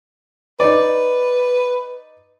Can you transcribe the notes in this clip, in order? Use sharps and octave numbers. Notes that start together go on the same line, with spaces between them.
D#4 B4 D5